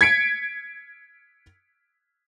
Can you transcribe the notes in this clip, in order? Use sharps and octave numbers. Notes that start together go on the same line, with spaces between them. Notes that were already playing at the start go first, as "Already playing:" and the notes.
G#6 B6 C#7 D7